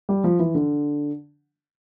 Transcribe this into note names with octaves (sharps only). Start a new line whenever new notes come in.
G3
F3
E3
D3